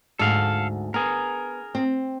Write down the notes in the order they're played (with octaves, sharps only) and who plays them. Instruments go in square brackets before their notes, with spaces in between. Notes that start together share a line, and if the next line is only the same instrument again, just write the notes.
[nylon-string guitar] D2 G#2 [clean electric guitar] A4 F5
[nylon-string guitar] B3 [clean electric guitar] G#4 A#4
[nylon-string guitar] C4